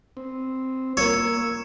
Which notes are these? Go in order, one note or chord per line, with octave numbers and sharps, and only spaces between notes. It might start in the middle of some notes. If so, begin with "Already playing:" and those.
C4
A#3 F4 A#4 C#5 E6